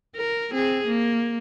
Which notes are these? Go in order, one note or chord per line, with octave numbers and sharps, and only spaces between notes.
A#4
C4 G#4
A#3